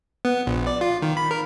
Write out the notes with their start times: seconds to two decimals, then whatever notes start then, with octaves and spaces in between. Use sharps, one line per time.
0.25 B3
0.46 A#1
0.67 D5
0.81 F4
1.02 D#3
1.17 B5
1.31 A#4